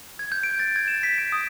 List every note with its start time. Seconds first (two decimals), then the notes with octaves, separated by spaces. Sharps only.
0.19 G#6
0.32 G6
0.43 D7
0.60 A6
0.76 G#6
0.88 E7
1.03 B6
1.18 D7
1.32 D#6